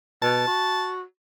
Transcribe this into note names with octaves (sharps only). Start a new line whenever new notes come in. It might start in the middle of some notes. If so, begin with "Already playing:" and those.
B2 A5
F#4